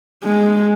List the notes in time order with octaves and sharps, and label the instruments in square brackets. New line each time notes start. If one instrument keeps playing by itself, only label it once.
[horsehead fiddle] G#3